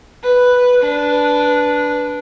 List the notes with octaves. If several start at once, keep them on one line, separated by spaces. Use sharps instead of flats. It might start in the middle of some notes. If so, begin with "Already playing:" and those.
B4
D4 B4